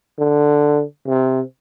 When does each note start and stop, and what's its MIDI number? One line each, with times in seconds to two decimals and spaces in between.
0.18 0.83 50
1.06 1.41 48